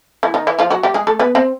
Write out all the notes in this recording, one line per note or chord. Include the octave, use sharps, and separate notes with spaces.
E3 E4
D#3 D#4
E3 E4
F3 F4
F#3 F#4
G3 G4
G#3 G#4
A3 A4
B3 B4
C4 C5